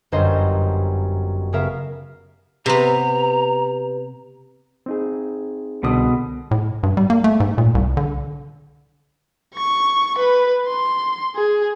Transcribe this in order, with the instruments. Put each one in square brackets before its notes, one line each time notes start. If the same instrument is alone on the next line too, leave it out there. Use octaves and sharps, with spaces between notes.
[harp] G1 F#2 C5 D#5 C6 G6
C#3 B3 A#4 E5 F5
[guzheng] C3 B3 [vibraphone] G4 B4 [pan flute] A#5
[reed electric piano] C4 D#4 G#4
[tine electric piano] C2 D3 D#6 [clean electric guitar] B2
[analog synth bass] A2
G2
G3
A#3
A3
G#2
A#2
C2
D3
[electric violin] C#6
B4
C6
G#4